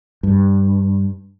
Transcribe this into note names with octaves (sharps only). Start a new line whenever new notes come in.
G2